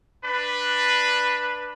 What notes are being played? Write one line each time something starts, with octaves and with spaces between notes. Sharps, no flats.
D4 B4